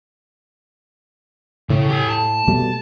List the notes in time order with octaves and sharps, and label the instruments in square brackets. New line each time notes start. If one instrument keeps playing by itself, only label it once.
[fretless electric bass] A2 [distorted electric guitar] C#3
[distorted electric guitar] G4 G#5
A5
[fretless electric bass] B2 G3 A3